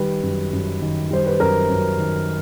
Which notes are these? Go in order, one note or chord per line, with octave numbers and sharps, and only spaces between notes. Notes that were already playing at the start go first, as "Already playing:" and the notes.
Already playing: D#3 G3 B4
F#2
F#2
D#3
G3 C5
B4
F#2 A#4
F#2
D#3